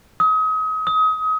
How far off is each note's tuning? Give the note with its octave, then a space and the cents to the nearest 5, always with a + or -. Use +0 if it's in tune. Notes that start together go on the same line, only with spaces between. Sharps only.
D#6 +35
D#6 +30